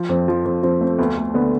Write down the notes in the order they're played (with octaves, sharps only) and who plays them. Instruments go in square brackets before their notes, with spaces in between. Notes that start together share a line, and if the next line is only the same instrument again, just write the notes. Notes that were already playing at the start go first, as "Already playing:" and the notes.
Already playing: [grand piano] F3
[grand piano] F2 [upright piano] C4
[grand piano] F3
[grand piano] F2 [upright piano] C4
[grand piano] F3 [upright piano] C4
[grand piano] A3 [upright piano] C4
[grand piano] D2 [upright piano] B3
[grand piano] D2
[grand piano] D3 [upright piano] B3